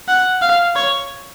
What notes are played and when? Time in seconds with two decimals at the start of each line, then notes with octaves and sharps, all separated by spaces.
0.08 F#5
0.42 F5
0.75 C#5